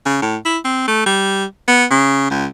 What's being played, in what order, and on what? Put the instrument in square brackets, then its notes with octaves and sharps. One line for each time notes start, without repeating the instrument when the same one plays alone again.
[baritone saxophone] C#3
A2
E4
C4
A3
G3
B3
C#3
C#2